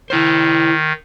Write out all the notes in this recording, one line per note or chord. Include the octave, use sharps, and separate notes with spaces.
D#3 E4 C5